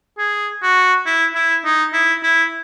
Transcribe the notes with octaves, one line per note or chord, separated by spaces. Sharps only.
G#4
F#4
E4
E4
D#4
E4
E4